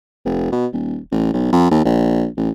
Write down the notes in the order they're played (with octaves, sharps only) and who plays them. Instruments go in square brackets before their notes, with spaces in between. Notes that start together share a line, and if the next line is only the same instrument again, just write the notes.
[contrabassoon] F1
B2
D#1
A1
B1
F2
D#2
A#1
A1